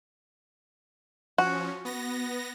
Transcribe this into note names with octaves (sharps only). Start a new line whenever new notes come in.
F3 C#4 F#4
B3 A#6